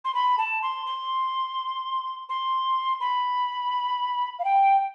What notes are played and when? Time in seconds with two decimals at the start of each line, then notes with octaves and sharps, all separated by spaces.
0.05 C6
0.14 B5
0.38 A5
0.63 C6
0.86 C6
2.29 C6
3.00 B5
4.39 F5
4.45 G5